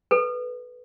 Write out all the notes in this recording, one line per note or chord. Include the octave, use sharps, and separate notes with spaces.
A4 B4